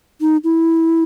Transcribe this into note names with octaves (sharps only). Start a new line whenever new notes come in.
D#4
E4